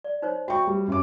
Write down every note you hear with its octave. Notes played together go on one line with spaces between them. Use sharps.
D5
D#4 C5 C#5
F#4 E5 G5 C#6
G3
F#2 C#4 D6